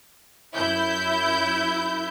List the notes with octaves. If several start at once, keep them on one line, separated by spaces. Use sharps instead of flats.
F#2 E4 G6